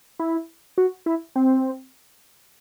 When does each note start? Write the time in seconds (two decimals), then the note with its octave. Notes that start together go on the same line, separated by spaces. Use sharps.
0.19 E4
0.78 F#4
1.06 E4
1.36 C4